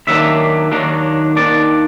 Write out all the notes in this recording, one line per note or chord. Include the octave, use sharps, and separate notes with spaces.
D#2 D#3 F#3 A#3 D4 E5
D#2 D#3 F#3 A#3 D4
D#2 D#3 F#3 A#3 D4 D5